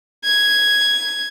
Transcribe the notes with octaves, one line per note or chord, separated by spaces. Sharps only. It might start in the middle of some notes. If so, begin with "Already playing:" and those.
G#6